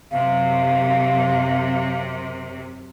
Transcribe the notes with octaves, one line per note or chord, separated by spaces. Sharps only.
F#2 C3 F5